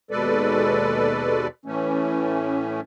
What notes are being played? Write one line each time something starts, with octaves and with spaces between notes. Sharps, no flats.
D#2 B2 G#3 A4 B4 D5
A2 E3 A3 C#4